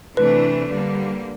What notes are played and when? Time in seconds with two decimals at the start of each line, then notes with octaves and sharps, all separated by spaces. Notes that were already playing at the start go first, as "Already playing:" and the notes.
0.17 C3 E3 A3 D4 B4
0.70 D3 G3 A#3